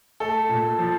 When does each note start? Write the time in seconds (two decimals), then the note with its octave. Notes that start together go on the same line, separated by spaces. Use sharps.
0.20 A3 A4
0.49 A#2
0.79 F3